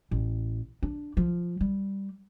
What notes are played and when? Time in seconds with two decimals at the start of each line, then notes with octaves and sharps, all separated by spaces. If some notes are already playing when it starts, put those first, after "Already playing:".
0.11 A1
0.83 D4
1.17 F3
1.61 G3